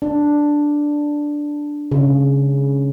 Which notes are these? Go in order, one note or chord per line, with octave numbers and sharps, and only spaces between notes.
D4
C#3